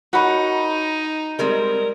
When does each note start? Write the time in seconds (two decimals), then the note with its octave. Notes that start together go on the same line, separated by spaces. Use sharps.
0.13 D#4 F#4 A#4 C#5 B5
1.39 G3 G#3 C4 A#4